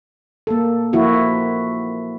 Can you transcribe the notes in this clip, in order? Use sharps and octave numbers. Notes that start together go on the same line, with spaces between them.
A#3 A4
F3 A#3 E4 F#4